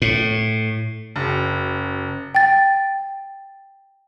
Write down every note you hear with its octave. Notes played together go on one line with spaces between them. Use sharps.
A2
F#1
G5 A6